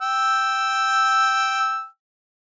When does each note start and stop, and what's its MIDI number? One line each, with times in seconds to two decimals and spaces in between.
0.02 1.86 79
0.02 1.86 88